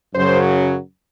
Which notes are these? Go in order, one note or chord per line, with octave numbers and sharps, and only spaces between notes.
F#2 C#3 F#3 C5